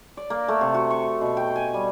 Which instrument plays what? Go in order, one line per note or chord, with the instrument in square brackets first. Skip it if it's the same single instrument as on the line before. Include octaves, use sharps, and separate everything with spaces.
[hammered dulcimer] D5
A#3
A3
C3
F#4
C#6
B2
G5
G#5
G3